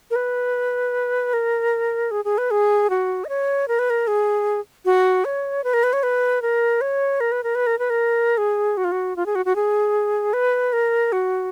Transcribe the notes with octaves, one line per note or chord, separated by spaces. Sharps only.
A#4
B4
A#4
G#4
G#4
B4
G#4
F#4
D#5
C#5
A#4
B4
A#4
G#4
F#4
C#5
B4
A#4
B4
C#5
B4
A#4
C#5
A#4
B4
A#4
B4
A#4
B4
A#4
G#4
F#4
F4
F#4
F4
G#4
F#4
F#4
G#4
B4
A#4
F#4